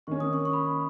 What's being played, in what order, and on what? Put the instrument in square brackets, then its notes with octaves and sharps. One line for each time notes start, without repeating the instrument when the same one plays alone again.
[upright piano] D#3 A#3 C#4 [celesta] C#6
[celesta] D#6
C#6
C#6
B5